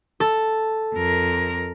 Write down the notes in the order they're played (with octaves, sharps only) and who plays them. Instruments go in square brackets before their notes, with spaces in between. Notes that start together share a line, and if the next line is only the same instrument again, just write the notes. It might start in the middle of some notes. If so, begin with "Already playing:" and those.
[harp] A4
[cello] F2 A#4